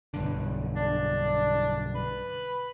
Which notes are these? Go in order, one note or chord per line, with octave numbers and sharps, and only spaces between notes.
B1 G2 D3
D4
B4